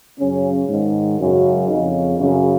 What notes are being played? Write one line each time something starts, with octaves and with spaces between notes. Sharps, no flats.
F#2 C#3 C#4
G#2 D#3
F#2 C#3
F2 C#3 D#4
F#2 C#3